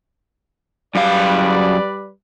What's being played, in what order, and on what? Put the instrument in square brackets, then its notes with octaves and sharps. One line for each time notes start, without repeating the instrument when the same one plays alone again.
[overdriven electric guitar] F#2 F5 [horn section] G3 B4 D5